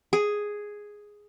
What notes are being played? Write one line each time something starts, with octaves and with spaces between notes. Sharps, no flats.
G#4